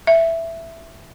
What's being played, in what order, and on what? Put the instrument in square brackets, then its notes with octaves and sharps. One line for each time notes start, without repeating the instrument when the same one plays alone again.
[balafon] E5